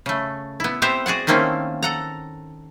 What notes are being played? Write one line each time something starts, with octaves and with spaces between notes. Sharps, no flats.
C#3 A3
B3 E4
B3 C4 G4 B4 C5 E5
F#4 G#4 D5 F#5
D#3 A3 A#3 C4 C#4 E4
A4 F#5 A#5